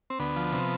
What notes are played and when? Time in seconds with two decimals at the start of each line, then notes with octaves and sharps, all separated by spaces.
0.10 C4
0.19 D2 B3
0.36 F3
0.52 C3